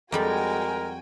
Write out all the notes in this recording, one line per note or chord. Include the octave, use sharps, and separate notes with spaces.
F2 G3 G#3 F#4 A#4 G5 G#5 B5